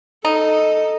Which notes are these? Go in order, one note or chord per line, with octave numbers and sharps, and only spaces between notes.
D#4 A4 D#5